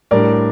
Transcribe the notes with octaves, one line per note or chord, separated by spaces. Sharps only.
A2 G3 D4 A#4 D5